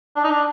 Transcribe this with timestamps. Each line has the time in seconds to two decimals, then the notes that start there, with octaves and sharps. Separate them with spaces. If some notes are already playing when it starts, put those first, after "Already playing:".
0.16 D4
0.24 D#4
0.30 D4